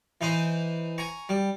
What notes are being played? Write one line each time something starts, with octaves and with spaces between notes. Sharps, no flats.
E3 D#4 C5 A#5
G#5 A#5 C#6
G3